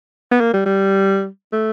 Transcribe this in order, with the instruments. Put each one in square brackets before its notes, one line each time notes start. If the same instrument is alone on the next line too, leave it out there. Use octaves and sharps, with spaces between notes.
[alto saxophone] B3
A#3
G3
G3
A3